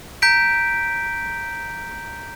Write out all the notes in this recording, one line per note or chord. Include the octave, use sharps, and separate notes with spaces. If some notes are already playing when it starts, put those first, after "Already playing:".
A#5 G6 B6 D7